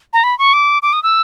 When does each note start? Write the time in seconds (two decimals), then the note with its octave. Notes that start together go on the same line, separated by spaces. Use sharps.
0.13 A#5
0.24 B5
0.39 C#6
0.53 D6
0.83 D6
0.93 D#6
1.03 E6